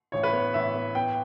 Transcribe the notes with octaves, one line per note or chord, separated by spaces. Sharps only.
A1 C#5
B4
B3 C#5
A1 E5
B3
B3 G5